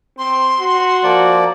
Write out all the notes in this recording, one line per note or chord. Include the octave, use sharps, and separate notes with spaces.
C4 C6
F#4
F3 A#3 D5